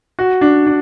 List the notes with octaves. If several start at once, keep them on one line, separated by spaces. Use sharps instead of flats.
F#4
D4
D4